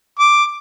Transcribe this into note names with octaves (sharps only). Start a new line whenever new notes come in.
D6